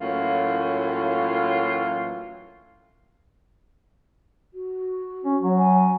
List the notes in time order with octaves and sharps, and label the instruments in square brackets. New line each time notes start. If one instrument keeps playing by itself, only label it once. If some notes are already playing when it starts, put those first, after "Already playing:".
[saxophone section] A2 E3 F#3 A#3 C#4 F4
[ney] F#4
[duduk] C#4
F#3
[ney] G#5